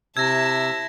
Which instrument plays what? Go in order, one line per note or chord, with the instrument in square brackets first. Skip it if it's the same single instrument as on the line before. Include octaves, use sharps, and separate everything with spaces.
[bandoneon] C3 E6 [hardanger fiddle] E4 A5 [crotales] G#6 A#6